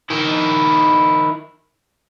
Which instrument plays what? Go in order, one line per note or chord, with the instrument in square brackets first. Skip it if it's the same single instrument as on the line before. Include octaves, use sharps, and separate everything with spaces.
[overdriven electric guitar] D#3 E4